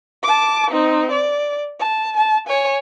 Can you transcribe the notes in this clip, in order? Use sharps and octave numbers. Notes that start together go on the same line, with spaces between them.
A5 D6
C4 D#4
D5
A5
A5
C#5 G#5